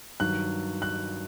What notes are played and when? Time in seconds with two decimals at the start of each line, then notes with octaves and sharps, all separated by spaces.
0.20 G2 D#3 F#3 F#6
0.82 F#6